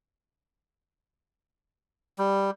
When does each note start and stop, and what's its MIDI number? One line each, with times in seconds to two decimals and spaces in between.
2.19 2.51 55